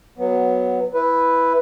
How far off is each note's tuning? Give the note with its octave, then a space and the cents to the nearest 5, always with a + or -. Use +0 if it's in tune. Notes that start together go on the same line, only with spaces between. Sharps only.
F#3 -5 B3 +0
E4 +0 B4 +0